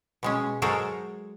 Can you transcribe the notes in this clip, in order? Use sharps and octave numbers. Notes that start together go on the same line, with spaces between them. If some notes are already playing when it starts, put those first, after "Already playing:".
B2 G#3 C#4
F#3 G#3 A4 A#4 C5 C#5